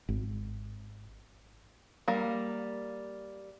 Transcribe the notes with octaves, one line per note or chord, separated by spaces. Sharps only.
G#1
G3 A#3